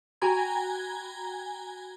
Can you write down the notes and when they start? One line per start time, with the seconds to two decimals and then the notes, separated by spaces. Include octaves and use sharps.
0.22 F#4 G5 G#5 A#5 B5 G#6